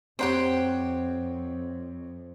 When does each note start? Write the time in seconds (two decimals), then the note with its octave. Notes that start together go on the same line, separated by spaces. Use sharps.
0.19 F2 C4 G4 C5 C#5 F#5 G5